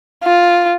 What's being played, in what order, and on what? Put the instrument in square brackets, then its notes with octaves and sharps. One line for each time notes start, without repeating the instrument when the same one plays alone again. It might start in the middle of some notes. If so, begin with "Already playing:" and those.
[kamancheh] F4